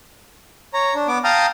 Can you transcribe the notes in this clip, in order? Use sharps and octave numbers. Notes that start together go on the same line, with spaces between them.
C#5 A#5
D4
B3 D6
F5 G5 A5 A#5 D#6 F6